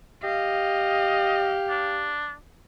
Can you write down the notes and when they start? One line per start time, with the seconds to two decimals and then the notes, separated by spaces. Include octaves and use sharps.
0.24 G4 D#5 F5
1.70 D4